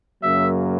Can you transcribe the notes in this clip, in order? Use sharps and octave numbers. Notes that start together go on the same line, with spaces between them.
F#2 C#3 F#3 A#3 E5